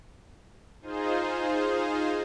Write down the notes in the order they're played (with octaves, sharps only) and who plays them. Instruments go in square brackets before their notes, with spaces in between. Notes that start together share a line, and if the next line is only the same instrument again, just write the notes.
[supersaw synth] D#4 F4 G#4 C5